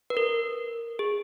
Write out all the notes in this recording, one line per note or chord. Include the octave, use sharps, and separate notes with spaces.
B4
A#4
G#4